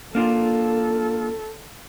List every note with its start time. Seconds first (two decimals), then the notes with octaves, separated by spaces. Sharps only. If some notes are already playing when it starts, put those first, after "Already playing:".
0.15 A#3 D4 F4 A4